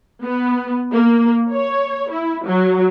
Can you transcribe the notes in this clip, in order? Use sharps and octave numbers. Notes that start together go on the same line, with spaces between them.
B3
A#3
C#5
E4
F#3